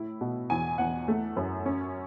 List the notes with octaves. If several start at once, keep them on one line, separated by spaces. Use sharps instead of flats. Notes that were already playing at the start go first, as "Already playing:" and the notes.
Already playing: A2 E4
B2
E2 G#5
E2 F#5
A3
F#2
C#4